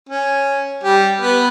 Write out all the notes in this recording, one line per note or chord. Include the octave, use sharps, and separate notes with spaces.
C#4
G3 G4
B3 B4